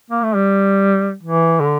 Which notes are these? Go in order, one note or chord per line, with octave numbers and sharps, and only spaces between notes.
A#3
A3
G3
E3
D3